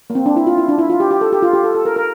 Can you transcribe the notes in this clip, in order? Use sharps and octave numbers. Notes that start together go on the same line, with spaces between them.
A#3
C4
D4
E4
F4
E4
D4
E4
F4
G4
G4
A4
G4
F4
G4
A4
A4
A#4
A#4